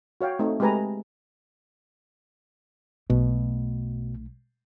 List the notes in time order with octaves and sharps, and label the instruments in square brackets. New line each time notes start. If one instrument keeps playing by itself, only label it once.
[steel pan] F#4 C#5 F5 G5
A3 C4 D#4
G#3 A3 G4 B4 G#5 A#5
[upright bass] B1 A3 [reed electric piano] B2